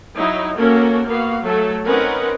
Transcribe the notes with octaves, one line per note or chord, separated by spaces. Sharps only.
F#3 D#4 E4
A#3 C#4 F#4 A4 A#4
A#3 B3 F#4 F5
F#3 A3 A4
C4 C#4 D#4 A#4 B4 F#5